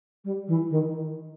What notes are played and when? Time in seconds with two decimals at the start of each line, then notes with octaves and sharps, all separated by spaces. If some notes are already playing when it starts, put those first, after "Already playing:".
0.25 G3
0.48 E3
0.70 D#3